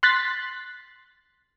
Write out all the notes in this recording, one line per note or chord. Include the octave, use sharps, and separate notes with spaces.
C6 F#6 A6 B6 C7